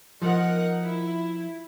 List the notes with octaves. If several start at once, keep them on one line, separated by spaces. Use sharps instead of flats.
F3 D#4 A#4 F#5
E4